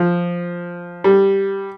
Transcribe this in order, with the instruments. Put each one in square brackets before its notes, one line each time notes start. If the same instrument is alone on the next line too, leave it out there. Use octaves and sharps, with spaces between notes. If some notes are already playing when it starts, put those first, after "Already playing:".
Already playing: [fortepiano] F3
G3